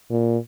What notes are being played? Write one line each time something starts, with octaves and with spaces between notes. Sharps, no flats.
A#2